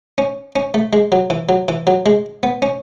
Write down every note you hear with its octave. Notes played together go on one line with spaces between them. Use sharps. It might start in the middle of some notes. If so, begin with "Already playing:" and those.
C#4
C#4
A3
G#3
F#3
E3
F#3
E3
F#3
G#3
B3
C#4